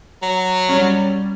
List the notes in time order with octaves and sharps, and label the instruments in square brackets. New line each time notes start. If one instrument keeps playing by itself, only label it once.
[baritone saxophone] F#3
[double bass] G3 [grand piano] C#4